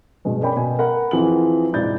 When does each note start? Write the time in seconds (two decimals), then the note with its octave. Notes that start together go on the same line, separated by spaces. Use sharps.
0.25 G2 B2 G#3
0.41 C#4 A#4 B4 D5 G5 B5
0.56 B2 G#5
0.79 A#4 F#5 B5
1.11 F2 E3 F3 C4 G#4 F#7
1.73 E1 G#2 E4 D5 G6 A6